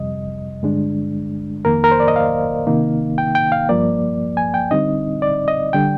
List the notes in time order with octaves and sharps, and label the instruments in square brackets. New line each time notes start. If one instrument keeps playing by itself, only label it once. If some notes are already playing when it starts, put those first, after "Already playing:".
Already playing: [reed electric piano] F2 C3 G3 D#5
G2 D3 G#3 D4
F2 D#3 A#3 A#4
A#4
C5
D5
D#5
F5
C3 D#3 A#3 D#4
G5
G5
F5
G2 F3 A#3 D5
G#5
G5
D3 G3 C4 D#4 D#5
D5
D#5
D3 G3 D4 G5